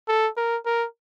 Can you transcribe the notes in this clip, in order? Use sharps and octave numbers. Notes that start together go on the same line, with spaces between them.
A4
A#4
A#4